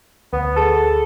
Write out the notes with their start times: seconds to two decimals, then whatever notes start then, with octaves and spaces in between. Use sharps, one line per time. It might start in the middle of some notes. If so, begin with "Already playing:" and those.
0.33 D2 B3
0.56 G#4 A4 A5